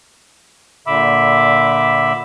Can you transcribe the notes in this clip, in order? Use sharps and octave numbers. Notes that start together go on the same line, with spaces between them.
A#2 D3 E5 B5 D6 E6